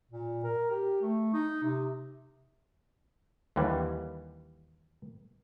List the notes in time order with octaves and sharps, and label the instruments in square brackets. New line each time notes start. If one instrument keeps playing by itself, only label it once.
[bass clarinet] A#2
A#4
G4
A3
D#4
C3
[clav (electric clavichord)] D#2 D3 E3 G3